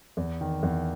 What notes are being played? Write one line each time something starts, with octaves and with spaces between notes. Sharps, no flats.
E2
D#3
E2